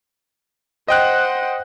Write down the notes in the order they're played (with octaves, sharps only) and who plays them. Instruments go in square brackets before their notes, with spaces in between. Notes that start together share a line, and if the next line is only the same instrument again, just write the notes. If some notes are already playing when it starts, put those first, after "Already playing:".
[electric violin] C5 F#5 [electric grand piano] D#5 G5 F#6